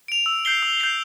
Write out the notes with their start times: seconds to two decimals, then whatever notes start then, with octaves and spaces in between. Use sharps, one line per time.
0.08 D7 F7
0.26 E6
0.45 G6 C7 G7
0.63 E6
0.80 G6 C7 G7